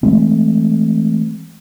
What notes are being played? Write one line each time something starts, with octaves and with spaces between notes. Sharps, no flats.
E3 G#3 A3 C4